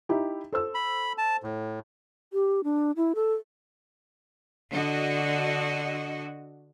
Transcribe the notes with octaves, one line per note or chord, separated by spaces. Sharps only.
D#4 E4 G4
A4 C5 E6
B5
A5
A2
G4
D4
E4
A4
D3 F#4 D#5